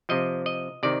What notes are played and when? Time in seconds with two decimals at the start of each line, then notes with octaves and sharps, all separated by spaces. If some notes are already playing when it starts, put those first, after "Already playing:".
0.09 C3 F3 D#5
0.46 D#5
0.83 C3 D#3 D5